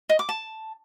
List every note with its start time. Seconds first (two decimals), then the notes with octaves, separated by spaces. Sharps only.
0.09 D#5
0.19 D6
0.29 A5